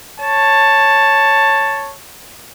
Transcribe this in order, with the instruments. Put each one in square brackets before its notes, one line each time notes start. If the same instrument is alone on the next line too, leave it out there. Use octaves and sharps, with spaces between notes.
[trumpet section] C#5 A5